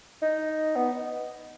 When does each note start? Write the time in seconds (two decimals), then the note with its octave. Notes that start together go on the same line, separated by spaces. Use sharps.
0.22 D#4
0.76 B3